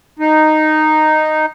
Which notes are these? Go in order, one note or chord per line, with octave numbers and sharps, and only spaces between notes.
D#4